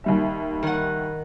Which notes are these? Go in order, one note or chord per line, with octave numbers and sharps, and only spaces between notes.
D#2 G3 E5
D#3 F#5